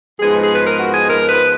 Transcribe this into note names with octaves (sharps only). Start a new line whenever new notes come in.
G#2 F3 G#3 B3 D#4 G#4
G#4
B4
A#4
F#4
G#4
A#4
B4